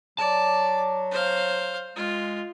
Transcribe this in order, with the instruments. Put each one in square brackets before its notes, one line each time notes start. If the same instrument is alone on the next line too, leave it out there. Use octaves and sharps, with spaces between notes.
[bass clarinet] F#3 [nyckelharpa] D5 [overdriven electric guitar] A5
[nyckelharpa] C5 F5
[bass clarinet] G#3 [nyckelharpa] F4